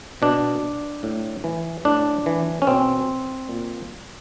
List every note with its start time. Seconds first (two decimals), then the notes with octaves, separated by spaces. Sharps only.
0.22 B2 D4
1.03 A2
1.44 E3
1.85 A2 D4
2.26 E3
2.62 C#4
2.67 B2 C4
3.49 A#2